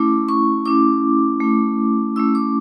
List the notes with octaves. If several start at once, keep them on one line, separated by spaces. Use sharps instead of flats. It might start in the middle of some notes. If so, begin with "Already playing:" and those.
Already playing: A3 C#4 E4 D6
C#6
A3 C#4 E4 D6
A3 C#4 E4
A3 C#4 E4 E6
D6